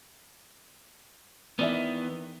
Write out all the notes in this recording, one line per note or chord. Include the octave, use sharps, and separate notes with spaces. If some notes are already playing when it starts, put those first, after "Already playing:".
D#3 E3 B3 D5 E5